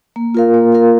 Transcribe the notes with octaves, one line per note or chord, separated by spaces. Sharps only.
A#3
F4 A#4 F5
A#3
F4 A#4 F5